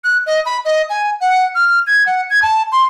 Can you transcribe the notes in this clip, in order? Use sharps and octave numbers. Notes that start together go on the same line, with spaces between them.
F#6
D#5
B5
D#5
G#5
F#5
F6
G#6
F#5
G#6
A5
C6